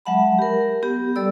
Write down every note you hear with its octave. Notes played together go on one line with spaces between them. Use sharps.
F#3 G#3 E5 F#5 A5 B5
G4 A#4
B3 G4
G3 A4 D5 E6